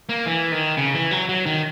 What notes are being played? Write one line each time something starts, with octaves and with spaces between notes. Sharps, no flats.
A#3
E3
D#3
C#3
E3
F#3
F#3
D#3